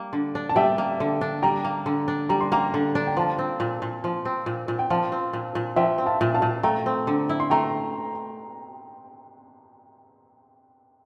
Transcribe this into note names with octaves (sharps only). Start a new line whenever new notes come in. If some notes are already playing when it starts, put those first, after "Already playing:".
Already playing: G3 A#3
D3
D4
A5
G3 E5 G5
A#3
D3
D4
G3 G5 A#5
A#3
D3
D4
G3 A#5
C6
A#3 G5 A#5
D3
D4
G5
F3 F5 A5
C4
A#2
A#2
F3
C4
A#2
A#2
G5
F3 F5 A5
C4
A#2
A#2
F3 E5 G5
C4
F5 A5
A#2
F5 A5
A#2
A3 G5 A#5
C4
D3
E4
C6
A3 G5 A#5